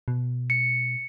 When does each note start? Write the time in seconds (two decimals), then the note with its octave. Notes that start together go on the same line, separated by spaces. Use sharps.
0.08 B2
0.50 C#7